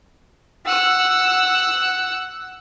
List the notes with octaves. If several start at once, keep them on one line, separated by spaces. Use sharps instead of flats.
F#5 E6